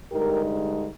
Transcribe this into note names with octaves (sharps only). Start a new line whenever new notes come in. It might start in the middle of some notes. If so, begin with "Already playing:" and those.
G2 D3 G#3 D#4 G4 A#4